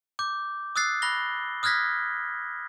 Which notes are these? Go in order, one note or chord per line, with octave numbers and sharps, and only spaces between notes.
D6 G6
D#6 E6 F#6 A6 C7
B5 F#6 A#6 G7
D#6 F6 F#6 G#6 A#6 B6